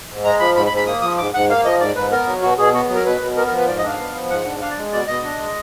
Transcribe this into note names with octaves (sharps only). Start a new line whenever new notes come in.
G#2
G#3 A#5
F3 B5
G#2 B5
B5
G#2
B5
A#3 D#6
F3 D#6
G#2 D6
G#2 F#5
A#3 F5
F3 D#5
G#2 D5
G#2 B4
B3 A#4
F#3
B2 F#4
B2 G#4
B3 F#4
F#3
A#4
B2 B4
B2
B3 A#4
A#4
F3
B4
G#2 D5
D#5
D4 F5
B3
F3
G#2 F#5
D4
D4 F5
D5
G#3
B2 D5
B2 D#5
D4
G#3